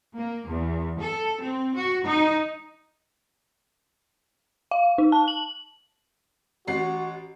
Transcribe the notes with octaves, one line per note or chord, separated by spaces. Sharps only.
A#3
E2
A4
C4
F#4
D#4
F5
D#4
A5
F#7
A1 F#4 C7